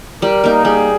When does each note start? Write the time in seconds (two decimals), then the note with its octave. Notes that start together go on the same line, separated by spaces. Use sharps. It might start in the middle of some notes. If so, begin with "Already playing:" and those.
0.22 G3 A#4
0.44 A#3 D#4
0.65 G3 G#4